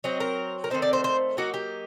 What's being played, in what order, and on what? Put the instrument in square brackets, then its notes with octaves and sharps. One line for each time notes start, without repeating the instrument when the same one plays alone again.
[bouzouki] F#3 C4 D#4
A#4
A#4
D#3 A3 C4 D#4 C5
D5
C5
C5
F#3 A#3 D#4 F#4
G4